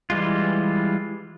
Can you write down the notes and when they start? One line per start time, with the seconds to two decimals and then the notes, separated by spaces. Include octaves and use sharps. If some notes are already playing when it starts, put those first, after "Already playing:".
0.10 E3 G3 G#3 F4